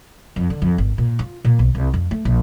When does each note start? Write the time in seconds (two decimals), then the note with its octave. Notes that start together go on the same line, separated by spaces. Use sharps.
0.36 F2
0.50 D3
0.62 F2
0.78 G#1
0.98 A#2
1.19 F4
1.44 A#2
1.59 B1
1.75 C2
1.94 F2
2.11 A3
2.25 A#1